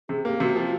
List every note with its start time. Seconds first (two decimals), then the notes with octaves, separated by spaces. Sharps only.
0.09 C3 G#4
0.25 A#3 G4
0.40 C3 F#4
0.56 F3